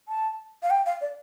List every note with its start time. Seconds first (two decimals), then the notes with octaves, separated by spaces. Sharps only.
0.08 A5
0.63 F5
0.70 G5
0.86 F5
1.01 D5